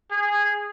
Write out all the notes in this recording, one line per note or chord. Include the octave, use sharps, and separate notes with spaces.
G#4